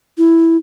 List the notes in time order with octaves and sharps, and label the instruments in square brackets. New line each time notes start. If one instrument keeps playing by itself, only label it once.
[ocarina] E4